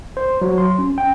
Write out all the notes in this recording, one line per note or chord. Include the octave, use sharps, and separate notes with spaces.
C5
F#3
C6
C#4
G5